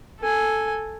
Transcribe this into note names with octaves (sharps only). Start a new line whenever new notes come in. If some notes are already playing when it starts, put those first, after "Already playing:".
A4 G#5